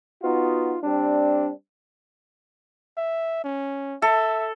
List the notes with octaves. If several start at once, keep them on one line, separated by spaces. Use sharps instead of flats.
B3 D#4 F4 F#4
G3 C4 D4
E5
C#4
A4 E5